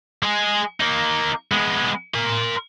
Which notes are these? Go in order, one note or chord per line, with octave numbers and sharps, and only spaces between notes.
G#3 G#4
A#3 D#4
G#3 B3
A#4 C6